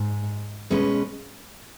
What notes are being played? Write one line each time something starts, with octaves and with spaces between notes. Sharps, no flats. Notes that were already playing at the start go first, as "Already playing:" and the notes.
Already playing: G#2
B2 G#3 C#4 B4